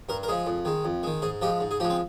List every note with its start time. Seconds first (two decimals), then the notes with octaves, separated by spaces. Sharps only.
0.09 G2 A#4
0.23 A#4
0.28 F3 G#3 G#4
0.46 F2
0.65 D#3 G#3
0.85 F2
1.03 D#3 G#3
1.22 G#2 G#4
1.42 F3 G#3 G4
1.60 G#2
1.71 G#4
1.80 F3 G#3 G4
1.90 C4